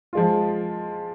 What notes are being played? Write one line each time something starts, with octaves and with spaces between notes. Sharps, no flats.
F3 G#3 F4